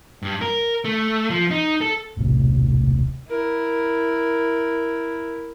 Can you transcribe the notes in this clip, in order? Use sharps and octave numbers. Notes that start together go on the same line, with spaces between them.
G2
A#4
A3
F3
D#4
A4
D#1 B1 A2 C3
E4 A#4